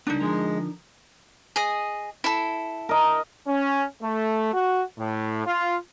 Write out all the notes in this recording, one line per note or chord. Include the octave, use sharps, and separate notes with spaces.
C#2 G3 A#3 D4 D#4
D3 F3 G#3 A#4
G#4 D#5
E4 A4
A#4 D#5
C#4
A3
F#4
A2
F4